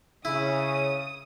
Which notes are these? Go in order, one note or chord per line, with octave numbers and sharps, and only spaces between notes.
C#3 E4 D#6